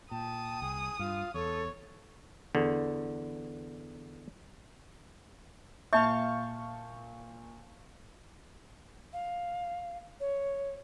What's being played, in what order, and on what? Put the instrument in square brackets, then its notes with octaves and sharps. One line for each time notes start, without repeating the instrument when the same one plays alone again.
[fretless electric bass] A#2 [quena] G5 [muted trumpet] A5 [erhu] D#6
[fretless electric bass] C2 [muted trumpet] G#4
[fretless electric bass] G2 [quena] F4 [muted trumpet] F5
[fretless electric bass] E2 [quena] A4 [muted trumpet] C#5
[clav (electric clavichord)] E2 D3
[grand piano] A#2 G6 [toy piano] E5 [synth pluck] F5 A5 C#6
[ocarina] F5
C#5